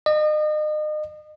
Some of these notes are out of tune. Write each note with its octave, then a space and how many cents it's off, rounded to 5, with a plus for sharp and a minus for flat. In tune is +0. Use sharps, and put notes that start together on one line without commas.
D#5 -35